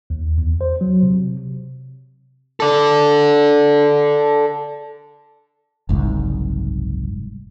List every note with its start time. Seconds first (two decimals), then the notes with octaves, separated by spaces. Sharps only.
0.10 D#2
0.38 E2
0.61 C5
0.81 F#3
1.03 C3
2.60 A4 D5
5.89 F#1 C2 G#2